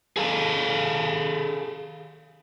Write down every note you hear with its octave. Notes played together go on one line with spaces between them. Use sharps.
G#4 A4 F5 F#5 A5